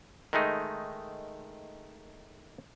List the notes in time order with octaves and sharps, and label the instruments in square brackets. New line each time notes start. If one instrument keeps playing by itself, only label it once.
[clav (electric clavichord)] D#3 G#3 A3 D#4